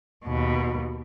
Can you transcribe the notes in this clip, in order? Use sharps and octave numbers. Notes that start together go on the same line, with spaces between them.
D#2 B2